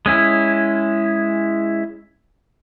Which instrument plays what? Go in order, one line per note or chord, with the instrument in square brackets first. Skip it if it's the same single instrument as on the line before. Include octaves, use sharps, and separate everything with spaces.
[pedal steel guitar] G#3 C#4 E4